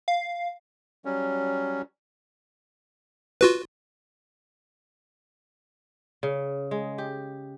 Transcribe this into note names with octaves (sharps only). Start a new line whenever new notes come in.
F5
F#3 G3 C#4
F4 F#4 B4
C#3
G#3
G4